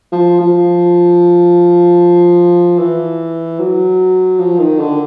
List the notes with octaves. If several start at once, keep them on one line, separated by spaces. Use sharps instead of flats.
F3
F3
E3
F#3
F3
D#3
D3